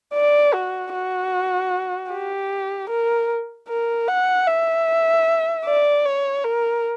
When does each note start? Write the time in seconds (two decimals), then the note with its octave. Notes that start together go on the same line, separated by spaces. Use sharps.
0.14 D5
0.54 F#4
0.93 F#4
2.11 G4
2.90 A#4
3.69 A#4
4.08 F#5
4.47 E5
5.66 D5
6.06 C#5
6.44 A#4